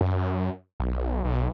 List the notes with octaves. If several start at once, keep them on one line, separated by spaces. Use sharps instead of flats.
F#2
B1
B1